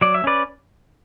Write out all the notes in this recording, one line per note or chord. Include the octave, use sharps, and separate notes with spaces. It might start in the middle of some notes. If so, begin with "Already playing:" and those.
F#3 D5
E5
C#4 B4 D5